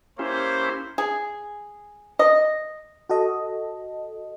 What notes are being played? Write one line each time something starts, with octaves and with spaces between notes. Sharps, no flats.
A#3 C#4 E4 G4 C5
G#4
D#5
F#4 A4 D#5